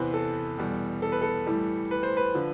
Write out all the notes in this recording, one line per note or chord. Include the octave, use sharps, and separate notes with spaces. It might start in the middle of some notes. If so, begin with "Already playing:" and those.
Already playing: E2 C3 E3 B4 C5
A4
E2 B2 G3
A4
B4
A4
A2 E3 G3
B4
C5
B4
D3 F3